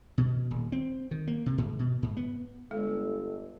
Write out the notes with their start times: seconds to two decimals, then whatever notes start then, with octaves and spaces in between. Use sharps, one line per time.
0.18 B2
0.51 D#1
0.72 C4
1.11 D#3
1.28 A#3
1.46 C3
1.58 G#2
1.79 B2
2.02 G#2
2.17 B3
2.71 G1 G#3 A4